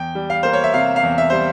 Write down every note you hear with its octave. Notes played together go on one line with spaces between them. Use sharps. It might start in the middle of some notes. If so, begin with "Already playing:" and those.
Already playing: E2 G5
G3
F5
A#3 C5
C#5
E5
C3 F5
F5
E2
E5
G3 C5